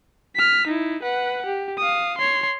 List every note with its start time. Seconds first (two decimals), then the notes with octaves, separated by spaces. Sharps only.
0.36 F6 B6
0.67 D#4 E4
1.02 B4 F#5
1.46 G4
1.78 F5 D#6
2.18 C#5 C6